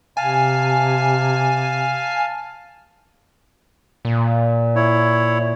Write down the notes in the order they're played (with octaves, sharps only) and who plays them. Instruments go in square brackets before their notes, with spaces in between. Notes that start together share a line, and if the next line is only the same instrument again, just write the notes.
[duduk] C3 [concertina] F5 A5 [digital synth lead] G#5
[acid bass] A#2
[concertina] E4 C#5